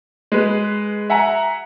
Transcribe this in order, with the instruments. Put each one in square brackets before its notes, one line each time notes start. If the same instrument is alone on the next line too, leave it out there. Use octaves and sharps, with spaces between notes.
[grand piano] G#3 B4
E5 F#5 G#5 A#5